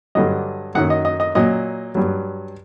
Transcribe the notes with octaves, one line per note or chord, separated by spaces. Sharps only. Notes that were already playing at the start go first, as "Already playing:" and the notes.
G2 D3 F#3 D#5
F#2 D#3 F#3 F#5
D#5
D#5
D#5
A#2 F#3 D#5
G2 F#3